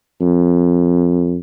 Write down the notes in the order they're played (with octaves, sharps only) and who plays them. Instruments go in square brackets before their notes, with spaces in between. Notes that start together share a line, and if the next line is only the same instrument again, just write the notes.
[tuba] F2